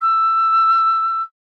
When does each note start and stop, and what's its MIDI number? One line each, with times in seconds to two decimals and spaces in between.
0.01 1.22 88